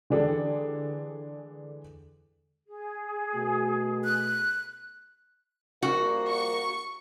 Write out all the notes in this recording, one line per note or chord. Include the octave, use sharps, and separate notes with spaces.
D3 E3 G#3 D4 G4 A4
G#4
B2 A3 F#4
F#6
A#1 G3 A#3 F#4
C#6